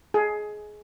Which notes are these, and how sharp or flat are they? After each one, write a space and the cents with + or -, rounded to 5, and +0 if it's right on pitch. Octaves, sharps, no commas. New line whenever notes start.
G#4 +20